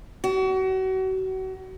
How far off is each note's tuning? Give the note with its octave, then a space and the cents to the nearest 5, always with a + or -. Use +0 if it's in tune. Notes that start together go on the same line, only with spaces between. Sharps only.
F#4 +35